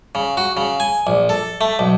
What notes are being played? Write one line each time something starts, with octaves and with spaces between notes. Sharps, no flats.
C#3
F#4
C#3
G#5
A#1
A4
A3
B1